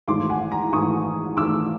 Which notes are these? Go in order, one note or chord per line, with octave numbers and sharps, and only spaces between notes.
G#1 G#2 E3 A3 C6 D6
F#5 G#5
G#5 A#5
G#1 G#2 E3 A3 C#6 D#6
G#1 G#2 E3 A3 D6 E6